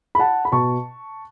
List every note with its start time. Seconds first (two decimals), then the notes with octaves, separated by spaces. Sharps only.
0.15 B5
0.19 F#5 A5
0.45 B5
0.52 B2 A5 C#6